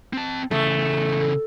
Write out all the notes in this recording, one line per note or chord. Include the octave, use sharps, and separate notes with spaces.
C4 A5
C#3 E3 A3